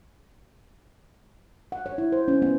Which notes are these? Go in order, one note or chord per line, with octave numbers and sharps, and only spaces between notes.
F#5
C#5
E4
C5
C#4
B3